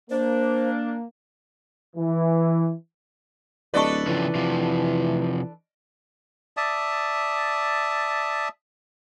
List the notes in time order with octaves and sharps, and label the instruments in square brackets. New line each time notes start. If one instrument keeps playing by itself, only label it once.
[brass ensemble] A#3 [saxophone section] D4 [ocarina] C5
[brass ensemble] E3
[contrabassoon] D1 [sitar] D4 A4 B4 [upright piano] D5 D#5 C#6
[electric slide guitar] C#3 F3 C#4 [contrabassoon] E3
[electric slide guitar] C3 F3
[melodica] D5 E5 A5 D#6